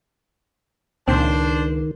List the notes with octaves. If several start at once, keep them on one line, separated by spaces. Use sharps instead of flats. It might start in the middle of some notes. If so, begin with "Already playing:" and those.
C#2 A#2 D#3 C4 D4 C5